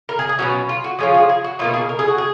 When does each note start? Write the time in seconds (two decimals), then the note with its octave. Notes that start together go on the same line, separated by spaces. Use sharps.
0.09 A#4
0.19 G#4
0.29 G#4
0.39 B2 F#3 C#4 F#4
0.69 F4
0.84 F#4
0.99 F3 G#3 C#4 F4 F#4
1.14 G#4
1.29 G#4
1.44 F#4
1.59 B2 A#3 D#4 F4
1.74 G#4
1.89 A#4
1.99 G#4
2.08 F#4
2.18 G#4